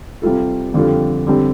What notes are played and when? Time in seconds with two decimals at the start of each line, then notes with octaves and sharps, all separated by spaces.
0.22 C3 G3 F4 A4
0.74 F2 D3 G3 F4 A4
1.27 D3 G3 C4